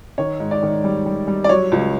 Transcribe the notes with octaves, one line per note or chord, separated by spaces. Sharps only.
D#3 C#5
G#2
D5
D#3
G3
G3
G3
D5
F#3 C#5
C#2